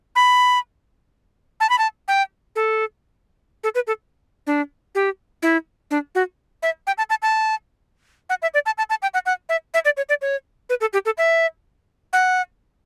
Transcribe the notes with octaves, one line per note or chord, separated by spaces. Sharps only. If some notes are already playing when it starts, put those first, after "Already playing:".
B5
A5
B5
A5
G5
A4
A4
B4
A4
D4
G4
E4
D4
F#4
E5
G5
A5
A5
A5
F#5
E5
D5
A5
A5
A5
G5
F#5
F#5
E5
E5
D5
C#5
D5
C#5
B4
A4
G4
A4
E5
F#5